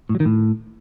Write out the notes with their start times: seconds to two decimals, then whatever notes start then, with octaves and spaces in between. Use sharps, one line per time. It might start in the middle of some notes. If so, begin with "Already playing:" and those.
0.09 A2
0.15 F#3
0.20 D#3
0.25 A2